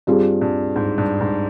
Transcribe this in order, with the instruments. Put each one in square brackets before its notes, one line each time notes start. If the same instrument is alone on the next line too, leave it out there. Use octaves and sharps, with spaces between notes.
[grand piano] G2 [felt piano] G3 C4 F4 G#4
[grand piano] G2
G#2
G2
G#2